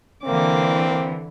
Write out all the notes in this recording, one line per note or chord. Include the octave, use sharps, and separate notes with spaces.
D3 E3 A#3 C4 D6